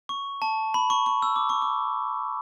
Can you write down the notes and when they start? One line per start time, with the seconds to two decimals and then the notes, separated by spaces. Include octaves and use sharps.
0.09 C#6
0.42 A5
0.74 B5
0.90 C#6
1.06 C#6
1.22 E6
1.36 D6
1.49 C#6
1.62 D6